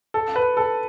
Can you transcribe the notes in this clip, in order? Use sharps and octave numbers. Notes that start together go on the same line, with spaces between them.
A4
B4
A4